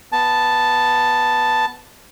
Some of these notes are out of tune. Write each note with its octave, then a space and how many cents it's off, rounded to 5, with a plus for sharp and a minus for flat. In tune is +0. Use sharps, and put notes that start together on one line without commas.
B3 +0 A5 +0